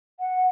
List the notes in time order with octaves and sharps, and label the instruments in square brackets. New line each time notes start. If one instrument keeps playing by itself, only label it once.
[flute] F#5